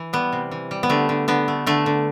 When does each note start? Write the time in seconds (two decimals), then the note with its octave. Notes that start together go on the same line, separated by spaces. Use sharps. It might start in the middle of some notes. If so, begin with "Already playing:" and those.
Already playing: E3
0.13 G3 B3
0.33 C3
0.51 E3
0.71 G3
0.83 B3
0.90 D3 A3
1.09 D3
1.28 D3 B3
1.48 A3
1.66 D3 A3
1.86 D3